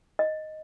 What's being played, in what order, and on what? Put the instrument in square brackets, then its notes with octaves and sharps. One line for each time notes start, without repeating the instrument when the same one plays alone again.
[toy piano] D#5